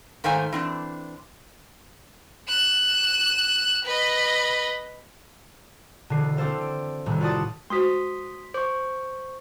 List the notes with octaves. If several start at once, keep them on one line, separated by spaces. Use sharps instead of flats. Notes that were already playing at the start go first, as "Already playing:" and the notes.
G#2 D#3 A3 C5 F5 G#5
E3 C4 D4
F#6 E7
B4 D#5
E1 D3 D4 G#4 C7
C4 D4 A4 C5 F5
D7
C2 A2 D#3
F4 F#4 D5 A5 D#6 A6
G#3 F#4 C5 C6 D#6 B6
C5 C#6 D6